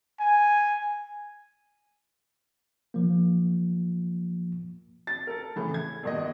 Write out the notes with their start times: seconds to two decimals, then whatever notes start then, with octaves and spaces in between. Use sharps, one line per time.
0.20 G#5
2.94 F3 A#3
5.07 A6
5.27 A4 A#4
5.56 A2 C#3 E3
5.74 G#6
6.03 G1 D#2 D#5